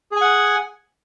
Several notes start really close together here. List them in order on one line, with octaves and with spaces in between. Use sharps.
G#4 G#5 F#5